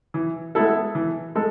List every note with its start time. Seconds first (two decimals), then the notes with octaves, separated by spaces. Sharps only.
0.14 E3
0.55 G#3 B3 E4 A4
0.95 E3
1.35 G#3 A4